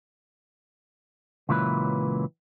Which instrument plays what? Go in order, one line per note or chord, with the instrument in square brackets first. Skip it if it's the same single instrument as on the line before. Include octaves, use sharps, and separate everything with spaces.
[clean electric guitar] C#2 A#2 E3 F#3 B4